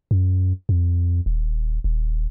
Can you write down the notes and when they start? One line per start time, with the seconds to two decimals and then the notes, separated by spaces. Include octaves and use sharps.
0.11 F#2
0.69 F2
1.26 D#1
1.84 D#1